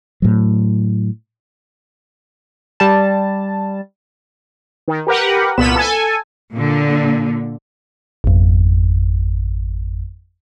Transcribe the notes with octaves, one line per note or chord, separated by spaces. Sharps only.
A2 F#3
G3 A5
D#3
G4 A#4 B4 F#5
C2 A#2 B3 B5 E7
A4 G#5
A#2 D3
G#1 F2